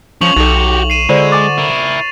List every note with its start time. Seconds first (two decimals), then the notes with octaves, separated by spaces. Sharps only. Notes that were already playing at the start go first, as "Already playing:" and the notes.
0.21 F3 C#4 F4 C#6 F7 F#7
0.36 B1 D#4 F#4 G4 A4
0.90 C7 D#7 E7
1.09 D3 G#3 F4 C5 D5
1.32 G#5 C6 D6 A6
1.58 E4 A#4